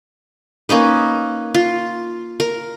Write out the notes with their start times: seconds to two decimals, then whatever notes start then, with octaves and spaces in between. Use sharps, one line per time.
0.69 A#3 C#4 D#4 B4
1.54 F4
2.40 A#4